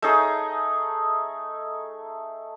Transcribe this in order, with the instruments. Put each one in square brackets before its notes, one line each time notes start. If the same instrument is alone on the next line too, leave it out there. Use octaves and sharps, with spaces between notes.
[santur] A3 D#4 G#4